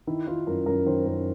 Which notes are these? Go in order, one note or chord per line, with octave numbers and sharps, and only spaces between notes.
D#3 E4
D#3 F4
F#2 A#4
F#2 A#4
D#3 C5
F#2 A#4